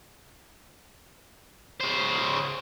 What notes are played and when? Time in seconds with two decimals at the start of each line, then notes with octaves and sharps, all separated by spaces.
1.81 C#3 C5